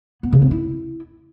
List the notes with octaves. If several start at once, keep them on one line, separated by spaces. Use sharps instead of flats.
B3
C#3
C4
E4